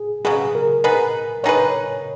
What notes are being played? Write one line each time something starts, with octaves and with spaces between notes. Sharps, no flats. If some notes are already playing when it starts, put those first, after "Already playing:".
Already playing: G#4
C#3 F#3 B3 G#4
A#4
B3 D#4 G#4 B4
B3 D#4 G#4 B4 C#5